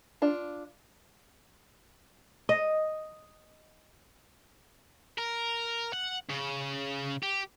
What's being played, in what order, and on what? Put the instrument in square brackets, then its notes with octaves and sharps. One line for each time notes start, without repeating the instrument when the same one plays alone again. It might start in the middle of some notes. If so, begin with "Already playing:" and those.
[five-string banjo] D4 F4
[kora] D#5
[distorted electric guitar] A#4
F#5
C#3
G4